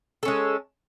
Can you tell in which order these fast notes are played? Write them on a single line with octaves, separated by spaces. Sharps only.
A4 C#4 G#3